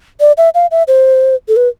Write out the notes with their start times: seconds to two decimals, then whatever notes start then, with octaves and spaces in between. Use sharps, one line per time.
0.20 D5
0.38 E5
0.55 F5
0.71 E5
0.88 C5
1.48 A4
1.56 B4